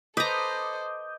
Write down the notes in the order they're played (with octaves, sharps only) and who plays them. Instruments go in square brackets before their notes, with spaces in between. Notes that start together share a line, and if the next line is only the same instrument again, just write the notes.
[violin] A4 C5 [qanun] B4 A#5 [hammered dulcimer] D#5 [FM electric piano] D6 D#6 G6